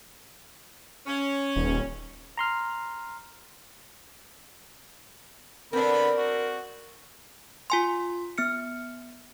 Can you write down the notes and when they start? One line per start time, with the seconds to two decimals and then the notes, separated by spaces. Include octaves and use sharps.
1.07 C#4
1.56 D#1
2.38 A#5 C6 F6
5.73 D3 B3 C4 D4 A#4 B5
6.17 F#4
7.70 F4 G#5 C6
8.38 B3 F6 C#7